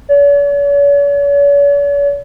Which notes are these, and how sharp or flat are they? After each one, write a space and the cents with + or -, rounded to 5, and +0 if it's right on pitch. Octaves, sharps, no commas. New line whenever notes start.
C#5 +45